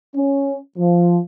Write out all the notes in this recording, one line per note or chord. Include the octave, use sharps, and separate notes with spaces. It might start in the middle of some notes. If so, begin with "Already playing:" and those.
C#4
F3